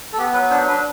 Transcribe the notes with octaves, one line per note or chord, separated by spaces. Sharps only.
A4
B3 G4
F#3 B4
D4 C5
D4 B4